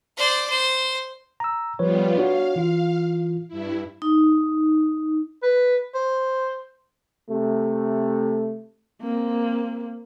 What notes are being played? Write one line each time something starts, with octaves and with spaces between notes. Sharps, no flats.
C5 D5
C5
A#5 E6
F3 G3 B3 F4 B4 C#5
D4 F#4 C#5 F5
E3 F4
G2 E4
D#4
B4
C5
C3 A3
A#3 C4